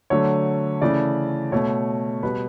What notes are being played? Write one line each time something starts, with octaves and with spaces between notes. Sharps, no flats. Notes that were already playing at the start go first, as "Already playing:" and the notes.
D3 F#3 A3 C#5
C#3 E3 A3 D5
B2 A3 C#5
B2 G3 B4